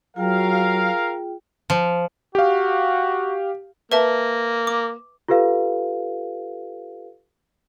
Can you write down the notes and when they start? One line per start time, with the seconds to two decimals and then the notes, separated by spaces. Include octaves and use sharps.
0.16 F#3 F4 G#4 A#4 F5 G5
1.70 F3
2.35 F#4 G4 F5
3.92 A#3 B4 E5 A5
4.67 D6
5.28 F4 G4 A4 B4 F5